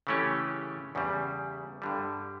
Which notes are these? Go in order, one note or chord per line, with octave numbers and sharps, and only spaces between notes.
C#3 E3 A3 C#4 G4
E2 C#3 G3
G2 D3 G3